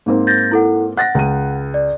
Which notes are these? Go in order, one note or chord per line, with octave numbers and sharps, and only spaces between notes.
G#2 A#3 C4
G6 A6 A#6
E4 A4 F#5
F#5 F#6 A6 A#6
C#2 D#7
D5